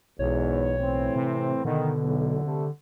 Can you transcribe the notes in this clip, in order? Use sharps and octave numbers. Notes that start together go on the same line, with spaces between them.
B1 E2 G#2 C#5
A2 E3 C4
C3
B2 D3 D#3
B1 E2
C3 G3 A3